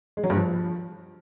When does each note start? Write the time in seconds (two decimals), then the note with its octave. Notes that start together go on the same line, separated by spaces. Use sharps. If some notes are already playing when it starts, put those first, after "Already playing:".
0.17 G#3
0.24 F#3
0.30 G2
0.37 F3